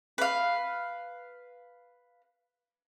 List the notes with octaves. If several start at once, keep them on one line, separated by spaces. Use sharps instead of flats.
B4 F5